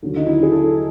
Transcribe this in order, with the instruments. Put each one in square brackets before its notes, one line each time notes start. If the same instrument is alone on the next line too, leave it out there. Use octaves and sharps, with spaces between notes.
[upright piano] D#2 D3 F#3
D#4
E4
G#4
A4